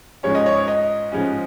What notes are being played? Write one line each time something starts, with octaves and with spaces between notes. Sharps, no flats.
G#2 F3 G#3 C#4 C#5
D#5
C#5
D#5
G#2 F3 G#3 C#4